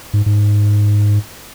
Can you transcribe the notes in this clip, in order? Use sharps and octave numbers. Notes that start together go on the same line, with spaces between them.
G#2
G#2